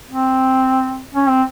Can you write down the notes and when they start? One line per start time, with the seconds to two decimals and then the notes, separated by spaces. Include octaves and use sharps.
0.10 C4
1.14 C#4
1.29 C4